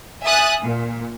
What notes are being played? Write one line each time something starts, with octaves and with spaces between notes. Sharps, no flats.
E5 G#5 D#6 F#6 A6
A#2